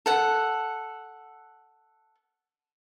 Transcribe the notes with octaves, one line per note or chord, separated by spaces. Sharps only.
A4 F#5